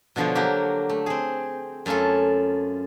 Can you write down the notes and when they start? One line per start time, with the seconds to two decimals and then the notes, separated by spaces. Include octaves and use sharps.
0.16 B2 D3 F3 B3 C#5
0.35 F#3 A#3 F#4 G4
0.89 A3
1.06 C4 G#4
1.86 F#2 A3 C#4 F4 A4